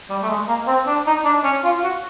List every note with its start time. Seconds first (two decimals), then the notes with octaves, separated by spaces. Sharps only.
0.10 G3
0.22 A3
0.29 G#3
0.48 A#3
0.67 C4
0.87 D4
1.06 D#4
1.25 D4
1.44 C#4
1.64 F4
1.83 F#4